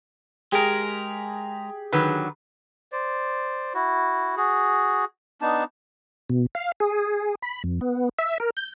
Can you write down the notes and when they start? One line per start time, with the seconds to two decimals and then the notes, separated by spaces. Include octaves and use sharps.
0.52 G#3 G4 G#4 A#4
1.93 D3 D#3 F#3 B4
2.92 C5 D5
3.74 E4 F#4
4.37 F#4 G#4
5.41 B3 D4 D#4 A5
6.30 B2
6.55 F5
6.80 G#4
7.42 B5
7.64 F2
7.81 B3
8.19 E5
8.40 A#4
8.57 G6